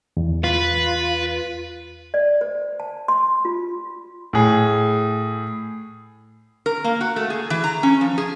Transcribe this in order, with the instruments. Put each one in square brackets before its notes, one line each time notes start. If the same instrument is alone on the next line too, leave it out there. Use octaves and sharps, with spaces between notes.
[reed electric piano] E2
[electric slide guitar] F4 [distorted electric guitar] B4
[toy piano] D5
C5
A5
C6
F4
[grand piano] A2 G#4
[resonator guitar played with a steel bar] A#4
A#3
F#4
A3
G#4
E3
A#5
C#4
F3
G#4